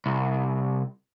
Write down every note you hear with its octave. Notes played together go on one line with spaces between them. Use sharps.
C2